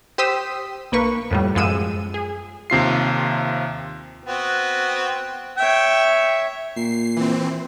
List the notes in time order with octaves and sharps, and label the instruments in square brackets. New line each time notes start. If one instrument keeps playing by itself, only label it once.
[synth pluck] G4 C5 D#6 E6 B6
B1 A#3 B4 C#6
F2 A2 G3
F#2 F3 G#3 E6 D#7
G#4
[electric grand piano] D#2 C3 F4 C7
[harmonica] B3 C4 F#4
[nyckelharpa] C#5 E5 [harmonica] G5
[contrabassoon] A#2 [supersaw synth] C7
[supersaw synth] E3 C4